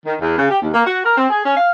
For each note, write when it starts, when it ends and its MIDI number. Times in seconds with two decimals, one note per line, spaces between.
0.06 0.15 51
0.21 0.35 40
0.38 0.47 49
0.51 0.58 67
0.62 0.70 39
0.74 0.86 58
0.86 1.01 66
1.04 1.16 70
1.18 1.30 60
1.30 1.41 68
1.46 1.57 61
1.57 1.71 77